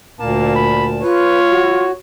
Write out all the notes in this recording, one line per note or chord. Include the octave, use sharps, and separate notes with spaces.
D2 A#2 A#3 A5
B5
F4 B4 C#5
F#4